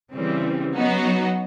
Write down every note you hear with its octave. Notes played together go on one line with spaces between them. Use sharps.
C#3 E3 G3 C4
F#3 B3 D#4 F#4